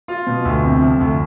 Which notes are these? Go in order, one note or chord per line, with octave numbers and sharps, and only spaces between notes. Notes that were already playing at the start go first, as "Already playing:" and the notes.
F4
B2
D2
C3
F3
D2